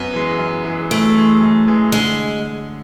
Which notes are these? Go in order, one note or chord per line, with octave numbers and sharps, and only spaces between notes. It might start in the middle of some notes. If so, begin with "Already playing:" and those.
Already playing: F#2 B3
E3 G#3
F#2
E3 G#3
F#2 A3
E3 G#3
F#2
E3 G#3
D3 G#3